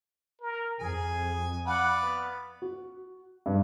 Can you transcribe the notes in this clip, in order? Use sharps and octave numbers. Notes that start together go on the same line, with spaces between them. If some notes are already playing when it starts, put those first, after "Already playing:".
A#4
F2 G#4 G#5
B4 D5 F5 F#5
B3
F#4
G2